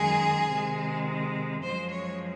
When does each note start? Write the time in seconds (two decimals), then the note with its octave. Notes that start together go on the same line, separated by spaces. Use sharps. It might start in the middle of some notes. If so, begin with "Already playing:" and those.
Already playing: F#2 D#3 G#3 G#4
0.49 C3 D#3 G#3
1.62 F#2 F3 G#3 C5
1.91 C#5